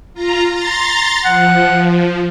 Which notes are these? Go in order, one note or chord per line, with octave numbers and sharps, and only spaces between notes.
F4 A#5
A#5 C6 A6
F3 F#5